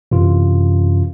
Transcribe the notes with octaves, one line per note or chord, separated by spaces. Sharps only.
F#2 C3 E3 F4